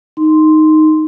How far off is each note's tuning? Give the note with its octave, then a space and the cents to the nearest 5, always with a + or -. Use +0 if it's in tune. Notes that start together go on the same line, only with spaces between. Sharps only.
D#4 +0 C6 +0